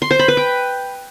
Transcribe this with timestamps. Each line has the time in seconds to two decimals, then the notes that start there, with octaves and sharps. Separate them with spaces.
0.02 C6
0.11 C5
0.19 B5
0.28 B4
0.37 G5